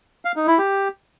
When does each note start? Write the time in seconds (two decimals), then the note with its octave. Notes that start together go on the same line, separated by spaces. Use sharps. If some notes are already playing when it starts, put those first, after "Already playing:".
0.25 F5
0.36 D#4
0.47 E4
0.58 G4